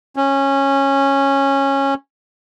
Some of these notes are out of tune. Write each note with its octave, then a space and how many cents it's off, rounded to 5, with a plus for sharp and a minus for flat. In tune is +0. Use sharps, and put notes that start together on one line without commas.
C#4 -15